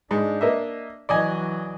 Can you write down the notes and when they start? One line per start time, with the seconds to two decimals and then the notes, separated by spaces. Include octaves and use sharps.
0.11 G#2 D4
0.41 A#3 D#5 E5
1.09 E3 F#3 D5 D#5 G#5